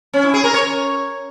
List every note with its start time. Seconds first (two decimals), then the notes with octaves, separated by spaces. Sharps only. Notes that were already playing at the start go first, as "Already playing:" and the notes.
0.13 C#4
0.24 E4
0.34 G#4
0.44 A#4
0.54 C#5